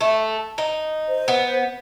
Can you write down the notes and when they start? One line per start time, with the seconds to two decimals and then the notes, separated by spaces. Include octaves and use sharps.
0.01 A3
0.58 D#4
1.08 C5
1.28 B3